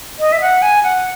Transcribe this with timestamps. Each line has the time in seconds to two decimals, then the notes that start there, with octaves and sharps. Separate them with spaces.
0.20 D#5
0.32 E5
0.41 F#5
0.62 G#5
0.83 F#5